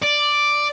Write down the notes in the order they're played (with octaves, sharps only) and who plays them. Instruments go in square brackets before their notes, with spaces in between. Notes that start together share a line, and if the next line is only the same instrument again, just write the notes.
[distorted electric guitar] D5